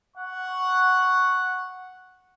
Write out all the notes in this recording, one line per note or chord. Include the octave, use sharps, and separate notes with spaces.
F#5 C#6